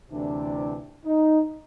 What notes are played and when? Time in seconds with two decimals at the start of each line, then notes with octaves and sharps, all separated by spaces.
0.10 D2 C3 E3 D4
1.05 D#4